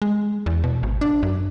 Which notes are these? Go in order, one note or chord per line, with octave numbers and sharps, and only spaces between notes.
G#3
E2
B2
G#1
D4
F#2